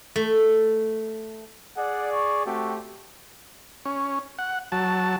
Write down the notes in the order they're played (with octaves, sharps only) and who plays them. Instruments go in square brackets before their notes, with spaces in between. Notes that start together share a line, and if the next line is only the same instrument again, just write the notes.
[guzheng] A3
[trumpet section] G#4 D5 [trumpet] F#5
[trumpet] C#6
[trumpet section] A3 C4 G4 [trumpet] F#4
[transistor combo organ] C#4
F#5
F#3 A5